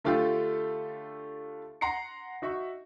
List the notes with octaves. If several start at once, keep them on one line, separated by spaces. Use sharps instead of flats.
D3 A3 D4 F4 G4 A4
F#5 A#5 C6 C7 C#7
D#4 F#4 E5 C#6